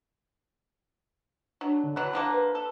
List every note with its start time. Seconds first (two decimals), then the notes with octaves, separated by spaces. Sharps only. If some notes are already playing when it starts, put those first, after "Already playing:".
1.61 F#3 D4
1.84 D3
1.96 E3 F#3 F#6
2.13 D3 F3 A#3
2.32 B4
2.55 A4